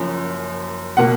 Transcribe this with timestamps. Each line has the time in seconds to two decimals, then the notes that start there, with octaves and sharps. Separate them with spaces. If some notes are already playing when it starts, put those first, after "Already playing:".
Already playing: F#1 F#2 F3 C#4
0.97 B2 A#3 F#5